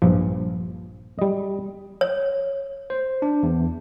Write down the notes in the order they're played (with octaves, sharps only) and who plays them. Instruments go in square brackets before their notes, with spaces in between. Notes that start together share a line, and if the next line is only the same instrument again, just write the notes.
[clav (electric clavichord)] A#1 G2 F3
G3 D#5
[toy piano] C#5
[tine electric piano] C5
D4
E2